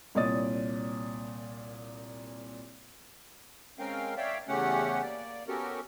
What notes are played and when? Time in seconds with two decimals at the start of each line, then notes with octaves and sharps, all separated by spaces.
0.15 C2 A#2 C#5 D5 D#6 A6
3.79 G#3 C4 C#4 A#4 F5 G5
4.17 C#5 D5 E5 F5 G5
4.48 E2 C#3 A3 C#4 G4 F#5
5.02 A#3 D5
5.48 B3 C#4 F#4 G4 A4 A#4